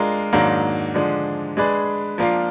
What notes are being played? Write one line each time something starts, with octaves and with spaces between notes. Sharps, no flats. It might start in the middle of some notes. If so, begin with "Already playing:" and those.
Already playing: G#3 D4 F4 A#4
G#2 D#3 F#3 A#3 D4
D3 F3 G#3 D4
G#3 D4 G#4 B4 D5
F3 A#3 D4 F4